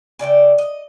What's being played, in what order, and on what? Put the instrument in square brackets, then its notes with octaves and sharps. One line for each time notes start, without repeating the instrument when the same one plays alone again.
[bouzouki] C#3 D5 E5 G5
D#5